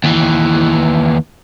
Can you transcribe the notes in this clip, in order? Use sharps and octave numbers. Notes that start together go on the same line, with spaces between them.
D#2 E3